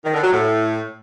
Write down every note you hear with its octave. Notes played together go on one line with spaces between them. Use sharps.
D#3
D3
F#3
A2